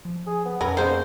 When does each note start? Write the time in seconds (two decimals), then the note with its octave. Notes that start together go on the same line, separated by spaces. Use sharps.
0.05 F3
0.27 G#4
0.45 B3
0.61 F2 C#4 A#4 B4
0.77 C#3 A#3 D#4 C5